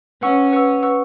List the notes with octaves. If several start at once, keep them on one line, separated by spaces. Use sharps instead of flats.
C#4 B4 F#5 C#6 E6
B4 F#5 C#6 E6
B4 F#5 C#6 E6